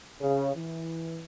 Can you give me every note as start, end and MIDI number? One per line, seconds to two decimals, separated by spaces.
0.21 0.51 49
0.56 1.24 52